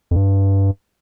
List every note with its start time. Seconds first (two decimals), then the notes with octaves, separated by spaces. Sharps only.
0.11 F2
0.16 G2